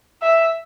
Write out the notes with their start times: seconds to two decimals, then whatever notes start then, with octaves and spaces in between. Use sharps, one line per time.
0.22 E5